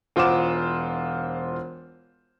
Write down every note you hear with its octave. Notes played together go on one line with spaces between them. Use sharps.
E1 F4 C5 F#5 D6 E7